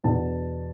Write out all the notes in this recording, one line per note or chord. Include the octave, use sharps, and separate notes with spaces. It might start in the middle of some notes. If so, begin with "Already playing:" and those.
E2 B2 B3 D4 A5